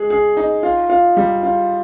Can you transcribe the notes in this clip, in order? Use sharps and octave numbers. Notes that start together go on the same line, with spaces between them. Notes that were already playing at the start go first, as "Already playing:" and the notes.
Already playing: G#3 G#4
G#4
D#4
F4
F4
G3
F4